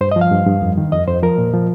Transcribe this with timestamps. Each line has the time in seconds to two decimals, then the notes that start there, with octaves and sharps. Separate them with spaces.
0.01 G2 C5
0.12 D#5
0.16 F3
0.21 F5
0.31 G2
0.47 G2
0.62 F2
0.78 D#3
0.92 F2 D#5
1.08 F2 C5
1.23 F3 A#4
1.38 A#2
1.53 F3